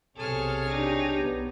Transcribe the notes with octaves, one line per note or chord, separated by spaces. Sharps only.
B1 C3 G#4 A4 C#5 F6
D4 D#4 G4
B1 B3